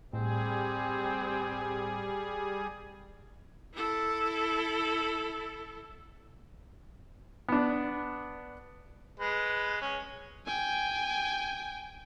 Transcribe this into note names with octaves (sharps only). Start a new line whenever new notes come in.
A2 G3 C4 G#4
E4 A4
B3 D4
G#3 B4
C#4
G5 G#5